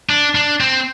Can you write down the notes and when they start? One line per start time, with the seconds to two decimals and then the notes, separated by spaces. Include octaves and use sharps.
0.09 D4
0.35 D4
0.60 C4